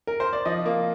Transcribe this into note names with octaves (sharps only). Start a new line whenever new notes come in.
A#4
C5
D5
F3 D#5
A#3